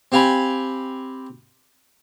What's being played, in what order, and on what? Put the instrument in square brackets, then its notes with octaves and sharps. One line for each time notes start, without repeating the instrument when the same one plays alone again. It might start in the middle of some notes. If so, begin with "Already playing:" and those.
[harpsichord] C4 G4 F5 G#5 B5